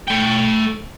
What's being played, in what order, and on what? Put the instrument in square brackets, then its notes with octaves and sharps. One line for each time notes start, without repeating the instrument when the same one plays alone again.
[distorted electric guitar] A3 G5